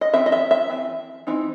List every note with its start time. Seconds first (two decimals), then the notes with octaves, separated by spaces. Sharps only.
0.01 D#5
0.13 E3 C4 E5
0.26 D#5
0.32 E5
0.51 E5
0.69 E3 C4
1.27 E3 C4 D#4